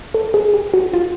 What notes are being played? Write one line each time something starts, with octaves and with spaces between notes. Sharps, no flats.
A4
G#4
G4
F#4
F4